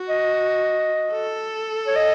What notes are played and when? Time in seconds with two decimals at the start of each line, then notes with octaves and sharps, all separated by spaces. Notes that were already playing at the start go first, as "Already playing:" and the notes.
Already playing: F#4
0.09 D#5
1.12 A4
1.87 C#5
1.96 D#5